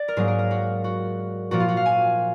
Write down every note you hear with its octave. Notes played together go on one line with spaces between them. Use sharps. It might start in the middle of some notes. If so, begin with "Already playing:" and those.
Already playing: D5
A#4
G#2 F#3 A#3 G#4
A#4
A#4
F#4
F#4
A#2 F3 A#3 F#4
F4
F#4
F5
G#5